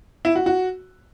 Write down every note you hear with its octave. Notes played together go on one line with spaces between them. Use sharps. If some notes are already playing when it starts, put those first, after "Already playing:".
E4
F#4
F#4